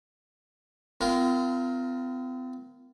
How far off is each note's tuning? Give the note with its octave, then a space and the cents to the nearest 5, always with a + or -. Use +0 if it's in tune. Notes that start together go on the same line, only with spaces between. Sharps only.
C4 -40 F4 -30 A#4 +0